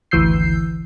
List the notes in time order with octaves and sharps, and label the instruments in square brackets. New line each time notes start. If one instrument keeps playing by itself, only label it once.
[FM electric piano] G#1 D2 E3 E6 G6 C7